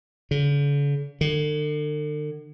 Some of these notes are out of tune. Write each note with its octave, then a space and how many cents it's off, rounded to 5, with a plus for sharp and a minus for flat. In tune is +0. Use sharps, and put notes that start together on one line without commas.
D3 -45
D3 +40